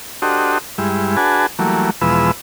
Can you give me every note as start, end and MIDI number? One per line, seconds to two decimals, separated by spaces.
0.22 0.58 62
0.22 0.58 66
0.22 0.58 67
0.22 0.58 69
0.22 0.58 72
0.22 0.58 75
0.78 1.16 43
0.78 1.16 55
0.78 1.16 56
0.78 1.16 64
1.17 1.46 62
1.17 1.46 66
1.17 1.46 68
1.17 1.46 71
1.17 1.46 80
1.17 1.46 81
1.59 1.90 52
1.59 1.90 54
1.59 1.90 55
1.59 1.90 57
1.59 1.90 58
2.01 2.31 40
2.01 2.31 47
2.01 2.31 53
2.01 2.31 56
2.01 2.31 71
2.01 2.31 88